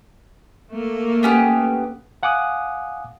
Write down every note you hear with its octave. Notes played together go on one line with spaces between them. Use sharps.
A3 A#3
B3 C#4 G4
F5 F#5 G#5 D6 D#6 F#6